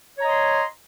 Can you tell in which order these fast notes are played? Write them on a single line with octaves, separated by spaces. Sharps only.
C#5 A#5 D#5 C6